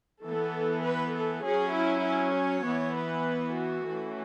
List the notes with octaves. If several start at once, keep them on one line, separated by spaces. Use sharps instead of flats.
E3 B3 A4
B4
A4
F#3 C#4 G#4
E4
E4
C#5
E3 B3
B4
F#4
E3 A3 C#4